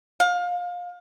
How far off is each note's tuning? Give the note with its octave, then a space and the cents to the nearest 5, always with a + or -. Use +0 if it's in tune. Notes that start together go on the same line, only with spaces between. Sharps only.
F5 +25